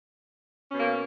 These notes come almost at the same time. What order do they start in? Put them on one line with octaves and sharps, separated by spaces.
C#4 B2 A#3